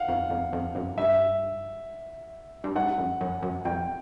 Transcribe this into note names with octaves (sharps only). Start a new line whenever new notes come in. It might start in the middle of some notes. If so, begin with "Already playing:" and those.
Already playing: F5 F#5
F2
F2
F2
F#2
G2 E5
G2
G#2 F#5
F#2
F#2
F#2
F2 G5